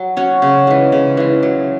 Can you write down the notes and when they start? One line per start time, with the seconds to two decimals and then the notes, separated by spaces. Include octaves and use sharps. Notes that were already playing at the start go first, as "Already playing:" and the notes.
Already playing: F#3
0.17 C#4 F#4 C#5
0.42 C#3
0.67 E3 G#3
0.92 C#3
1.17 E3 G#3
1.43 F#3